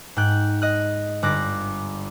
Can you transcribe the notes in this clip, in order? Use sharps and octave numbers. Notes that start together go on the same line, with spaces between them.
G#2 G5 F#6
D#5 F#6
G1 D6 F#6 A#6